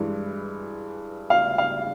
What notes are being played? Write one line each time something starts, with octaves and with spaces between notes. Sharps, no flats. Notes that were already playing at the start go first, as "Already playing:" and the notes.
Already playing: G2 E3 G#3
F5
F5